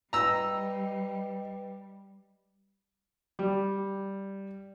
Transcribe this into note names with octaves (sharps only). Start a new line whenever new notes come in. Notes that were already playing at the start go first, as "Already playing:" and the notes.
G3 B4 D#5 G5 A#5 E6
G3